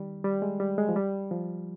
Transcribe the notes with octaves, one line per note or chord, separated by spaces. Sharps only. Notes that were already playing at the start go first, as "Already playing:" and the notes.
Already playing: D#3 G3
G3
G#3
G3
G#3
F3
G3
F3